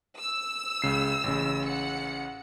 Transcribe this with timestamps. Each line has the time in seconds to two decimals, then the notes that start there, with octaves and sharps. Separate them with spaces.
0.19 E6
0.82 C#2 C#3 C7
1.24 A1 C#3
1.66 F#5 C#7